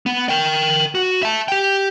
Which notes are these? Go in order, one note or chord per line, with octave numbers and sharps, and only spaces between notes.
B3
A#4 G5
F#4
E5 A5
G4 G5